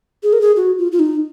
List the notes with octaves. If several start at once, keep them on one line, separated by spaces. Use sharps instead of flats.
G#4
A#4
G#4
F#4
F4
F4
D#4